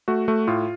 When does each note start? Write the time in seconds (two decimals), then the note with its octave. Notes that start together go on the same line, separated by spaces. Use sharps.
0.08 A3 F#4
0.28 A3
0.47 A2 F4